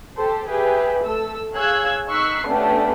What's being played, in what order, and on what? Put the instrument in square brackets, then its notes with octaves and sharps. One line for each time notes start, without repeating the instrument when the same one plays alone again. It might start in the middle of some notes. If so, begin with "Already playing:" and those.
[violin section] G4 A4 C5
G4 G#4 B4 E5
A3 A4 E6
G#4 C#5 F5 E6 F#6 G#6
D#4 C#6 E6 F#6 B6 C7
A3 B3 C#4 D4 G4